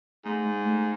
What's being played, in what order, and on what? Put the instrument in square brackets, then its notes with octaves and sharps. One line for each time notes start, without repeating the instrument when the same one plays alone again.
[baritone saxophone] G#2 [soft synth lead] A3
[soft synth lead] G#3
A3